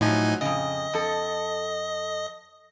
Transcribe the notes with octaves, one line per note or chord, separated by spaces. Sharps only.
A2 F3 F#3 D#4 G#5
F2 C#3 D#5
F2 A4